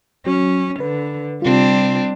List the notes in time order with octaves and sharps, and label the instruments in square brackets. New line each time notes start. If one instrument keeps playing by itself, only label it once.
[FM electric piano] F#3 [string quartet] C#4
[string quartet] D3 [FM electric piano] B4
[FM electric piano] C3 F4 [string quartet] G3 C4 D4